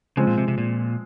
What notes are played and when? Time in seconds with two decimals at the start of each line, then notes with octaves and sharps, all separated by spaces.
0.17 C#3 F3 G#3 C4
0.27 A#2
0.38 C3
0.48 C3
0.58 A#2